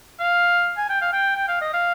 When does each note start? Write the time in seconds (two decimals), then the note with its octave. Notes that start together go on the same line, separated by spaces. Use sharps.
0.20 F5
0.77 G#5
0.89 G5
1.02 F5
1.13 G5
1.36 G5
1.48 F5
1.61 D#5
1.73 F5